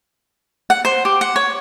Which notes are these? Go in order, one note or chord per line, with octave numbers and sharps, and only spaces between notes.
F#5
C5
G4
F#5
C#5